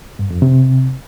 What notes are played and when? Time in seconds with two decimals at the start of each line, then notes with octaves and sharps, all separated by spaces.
0.19 G2
0.31 F2
0.42 C3